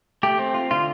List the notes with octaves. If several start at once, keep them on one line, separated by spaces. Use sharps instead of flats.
A3 G4
C4
F4
D3 F4